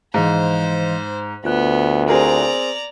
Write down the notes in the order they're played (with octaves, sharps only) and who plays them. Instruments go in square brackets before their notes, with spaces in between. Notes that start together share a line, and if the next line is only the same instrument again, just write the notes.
[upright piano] G#2 [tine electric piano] E3 D#5 F5 [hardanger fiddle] C5
[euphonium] D2 [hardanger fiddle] B3 [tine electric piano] F4 F#6
[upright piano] C4 G#4 A#4 [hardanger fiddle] D5 A#5